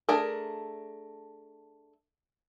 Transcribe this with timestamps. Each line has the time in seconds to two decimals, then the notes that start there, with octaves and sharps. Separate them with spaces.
0.09 A3 D4 G#4 A#4